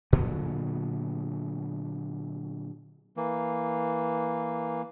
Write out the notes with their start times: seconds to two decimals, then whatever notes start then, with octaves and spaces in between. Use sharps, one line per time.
0.13 A#2 D3 F#3 B3
3.17 E3 A#3